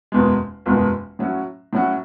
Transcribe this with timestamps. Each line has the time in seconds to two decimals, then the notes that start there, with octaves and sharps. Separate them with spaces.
0.12 F#1 E2 B2 G#3
0.66 F#1 E2 B2 G#3
1.19 A2 F#3 C#4 F#4
1.73 A2 F#3 C#4 F#4